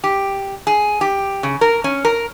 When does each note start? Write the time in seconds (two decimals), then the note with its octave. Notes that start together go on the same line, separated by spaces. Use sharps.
0.04 G4
0.67 G#4
1.01 G4
1.43 C#3
1.61 A#4
1.84 C#4
2.05 A#4